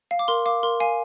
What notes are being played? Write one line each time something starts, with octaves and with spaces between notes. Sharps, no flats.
F5
D6
A#4 C6
F5 D6
A#4 C6
F5 G#5